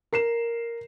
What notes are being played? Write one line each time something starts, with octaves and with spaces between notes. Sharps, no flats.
A#4 C7 E7